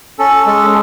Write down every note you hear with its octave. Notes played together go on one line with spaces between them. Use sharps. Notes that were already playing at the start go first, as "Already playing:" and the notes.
C#4 A4
G#3 A4